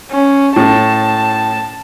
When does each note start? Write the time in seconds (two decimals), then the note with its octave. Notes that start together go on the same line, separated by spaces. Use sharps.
0.11 C#4
0.56 A2 A5